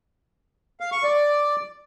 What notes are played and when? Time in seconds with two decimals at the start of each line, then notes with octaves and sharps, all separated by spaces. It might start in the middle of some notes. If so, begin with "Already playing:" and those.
0.80 F5
0.92 C#6
1.03 D5